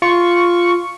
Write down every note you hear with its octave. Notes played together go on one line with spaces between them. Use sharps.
F4 C#6